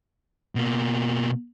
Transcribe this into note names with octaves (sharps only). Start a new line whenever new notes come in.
B2 A#3